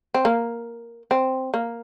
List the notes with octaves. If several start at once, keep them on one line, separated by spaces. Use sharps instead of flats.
C4
A#3
C4
A#3